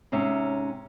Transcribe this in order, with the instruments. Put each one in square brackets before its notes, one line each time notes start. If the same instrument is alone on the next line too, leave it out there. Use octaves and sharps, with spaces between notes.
[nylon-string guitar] G#2 C3 C#4 E5